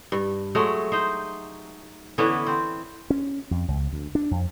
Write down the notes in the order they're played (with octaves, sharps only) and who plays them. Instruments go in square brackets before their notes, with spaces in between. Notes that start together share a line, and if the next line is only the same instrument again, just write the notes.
[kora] G2
F#3 G#3 A3
D#4 C5
D3 E3 B3 C#4
C4
[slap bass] C#4
F2
C#2
D2
D4
F2